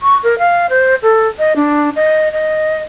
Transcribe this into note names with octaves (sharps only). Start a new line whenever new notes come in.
C#6
A#4
F5
C5
A4
D#5
D4
D#5
D#5